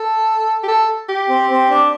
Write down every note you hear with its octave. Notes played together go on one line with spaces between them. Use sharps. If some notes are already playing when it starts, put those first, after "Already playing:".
Already playing: A4
G4
A4
G4
C4
C4
D4